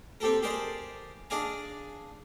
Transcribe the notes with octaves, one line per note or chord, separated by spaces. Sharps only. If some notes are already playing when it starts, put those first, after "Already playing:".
C4 G4 A4 A#4
G4 G#4 A#4 C5 D5 A5
D4 G#4 D5 F5 G#5 A#5